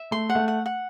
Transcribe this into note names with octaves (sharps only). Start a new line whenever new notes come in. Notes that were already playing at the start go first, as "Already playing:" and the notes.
Already playing: E5
A3 C6
F#5
A3
F#5
F#5